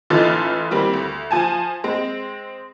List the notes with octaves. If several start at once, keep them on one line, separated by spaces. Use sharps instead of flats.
A1 E3 D#4 F4 A4 A6
D#3 G3 C4 E4
D2
F3 G#5 A5
G#3 C4